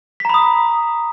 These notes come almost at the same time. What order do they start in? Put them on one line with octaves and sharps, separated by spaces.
B6 A#5 B5 D#6